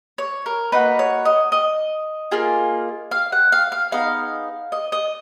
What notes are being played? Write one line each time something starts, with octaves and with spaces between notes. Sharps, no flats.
C#5
A#4
A#3 D#4 F#4 B4
C#5
D#5
D#5
A#3 F4 G#4
F5
F#5
F5
F5
B3 D#4 G#4 F5
D#5
D#5